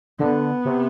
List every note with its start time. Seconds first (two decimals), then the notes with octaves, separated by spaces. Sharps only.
0.19 D3 B3
0.65 C3